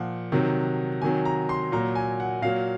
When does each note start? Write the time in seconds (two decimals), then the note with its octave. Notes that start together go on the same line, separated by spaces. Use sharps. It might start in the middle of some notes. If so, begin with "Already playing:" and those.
Already playing: A#2 F3 F#5
0.32 C3 D#3 F#3
1.02 C3 D#3 F#3 G#5
1.25 A#5
1.49 C6
1.72 A#2 F#3 A#5
1.95 G#5
2.20 F#5
2.42 A#2 F#3 F5